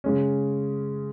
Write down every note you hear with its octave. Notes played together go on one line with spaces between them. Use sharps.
C#3 G#3 C#4